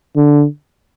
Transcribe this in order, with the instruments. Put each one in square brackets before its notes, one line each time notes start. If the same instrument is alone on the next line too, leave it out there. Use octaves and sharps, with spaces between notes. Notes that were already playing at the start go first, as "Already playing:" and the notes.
[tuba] D3